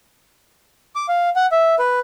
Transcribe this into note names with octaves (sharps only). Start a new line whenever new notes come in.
D6
F5
F#5
E5
B4